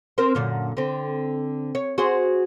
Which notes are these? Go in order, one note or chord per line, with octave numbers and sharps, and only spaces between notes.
C4 A#4 C5
F#2 A#2 D3
D3 C4
C#5
F#4 G#4 C5